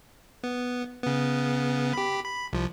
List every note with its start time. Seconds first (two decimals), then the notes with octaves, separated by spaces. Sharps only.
0.44 B3
1.03 C#3 B3
1.94 G4 B5
2.24 B5
2.53 C2 F3